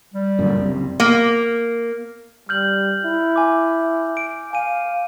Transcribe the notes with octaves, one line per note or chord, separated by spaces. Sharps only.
G3
F#2 A#2 D3
F#1 C2 C3
A#3
G3 F6 G6 F#7
E4
G#5 D6
D7
F5 G#5 D#7